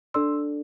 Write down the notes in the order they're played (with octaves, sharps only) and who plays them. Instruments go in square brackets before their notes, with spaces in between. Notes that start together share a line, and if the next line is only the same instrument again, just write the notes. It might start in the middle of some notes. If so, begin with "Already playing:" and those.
[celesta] D4 A4 D5 C6 E6